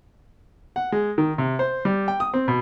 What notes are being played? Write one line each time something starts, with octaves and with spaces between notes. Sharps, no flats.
F#5
G#3
D#3
C3
C5
G3
G5
D#6
C4
B2